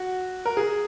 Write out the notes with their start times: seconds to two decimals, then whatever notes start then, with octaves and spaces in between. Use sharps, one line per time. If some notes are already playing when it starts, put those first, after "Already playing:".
Already playing: F#4
0.45 A#4
0.57 G#4